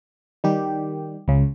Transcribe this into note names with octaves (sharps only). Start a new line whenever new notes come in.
D#3 G3 G4
C#2 C#3